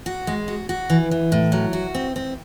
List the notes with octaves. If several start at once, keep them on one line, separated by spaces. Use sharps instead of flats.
F#4
G#3
F#4
F#4
E3
E3
A2
F#3
F#4
C4
C4